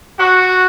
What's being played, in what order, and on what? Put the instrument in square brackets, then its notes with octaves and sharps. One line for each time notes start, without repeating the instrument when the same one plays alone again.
[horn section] F#4